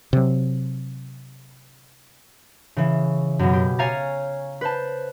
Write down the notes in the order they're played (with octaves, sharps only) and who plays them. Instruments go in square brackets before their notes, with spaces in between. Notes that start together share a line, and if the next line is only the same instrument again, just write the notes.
[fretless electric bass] C3 F#3
[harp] C#3 E3
F#2 B2
G4
C#5 F5 G#5 A#5 A6
B4 C5 A5